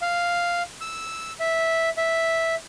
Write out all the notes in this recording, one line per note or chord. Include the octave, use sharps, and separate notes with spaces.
F5
E6
E5
E5